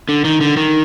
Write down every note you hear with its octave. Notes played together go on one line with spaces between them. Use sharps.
D3
D#3
D3
D#3